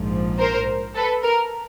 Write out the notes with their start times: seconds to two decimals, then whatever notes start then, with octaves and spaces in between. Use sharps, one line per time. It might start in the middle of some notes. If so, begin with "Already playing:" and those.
Already playing: A#1 G#2 F3
0.39 A#4 C5
0.95 A4 B4
1.23 A#4